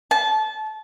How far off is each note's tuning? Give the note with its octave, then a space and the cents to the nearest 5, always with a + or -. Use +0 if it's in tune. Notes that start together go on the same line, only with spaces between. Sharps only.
A5 -25